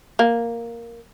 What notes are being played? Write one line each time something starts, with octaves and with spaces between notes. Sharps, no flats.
A#3